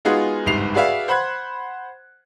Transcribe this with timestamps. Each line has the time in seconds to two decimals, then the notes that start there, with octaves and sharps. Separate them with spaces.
0.05 G#3 B3 D#4 F4 F#4 G#4
0.46 G1 C2 G#2 C7 F7
0.74 F#4 G#4 B4 D5 E5 F5
1.08 C5 F#5 B5 C6 F#6 G#6